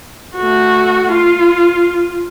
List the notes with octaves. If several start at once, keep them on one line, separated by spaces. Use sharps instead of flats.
A3 F#4
F4